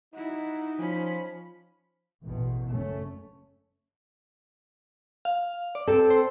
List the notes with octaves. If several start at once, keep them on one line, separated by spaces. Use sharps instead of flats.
D#4 E4 F#4
F3 C#4 B5
A1 E2 B2
F#1 A3 C#4
F5
D5
C4 A4
C5